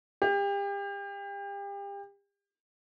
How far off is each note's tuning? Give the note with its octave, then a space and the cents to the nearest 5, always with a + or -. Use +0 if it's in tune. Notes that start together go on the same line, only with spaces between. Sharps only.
G4 +35